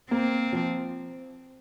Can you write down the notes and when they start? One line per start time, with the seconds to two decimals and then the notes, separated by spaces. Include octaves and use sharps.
0.11 A#3 C4
0.53 F3